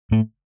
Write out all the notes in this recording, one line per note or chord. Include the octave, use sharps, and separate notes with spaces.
A2 A3